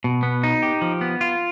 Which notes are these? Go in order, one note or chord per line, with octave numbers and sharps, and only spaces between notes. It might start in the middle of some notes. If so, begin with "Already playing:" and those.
B2
B3
D#4
G4
F3
B3
F4